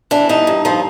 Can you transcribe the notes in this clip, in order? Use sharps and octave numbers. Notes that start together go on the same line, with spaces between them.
E3 D4
G2 D#4
G2
F3 D#4